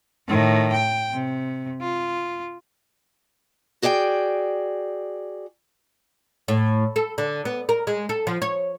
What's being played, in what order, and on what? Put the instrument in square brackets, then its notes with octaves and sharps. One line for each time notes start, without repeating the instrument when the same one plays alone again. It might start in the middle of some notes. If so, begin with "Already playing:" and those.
[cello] A2 D#3
G5
C3
F4
[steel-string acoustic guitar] F#4 G#4 D5 D#5 G5
[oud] A2
A4
D3
B3
A#4
G#3
A4
F3
C#5